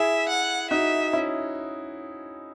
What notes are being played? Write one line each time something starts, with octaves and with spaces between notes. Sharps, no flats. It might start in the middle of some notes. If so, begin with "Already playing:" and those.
Already playing: E4 G#4 E5
F#5
D#4 F#4 E5
C#4 E4